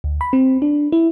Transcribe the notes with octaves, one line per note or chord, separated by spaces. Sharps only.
D2
B5
C4
D4
E4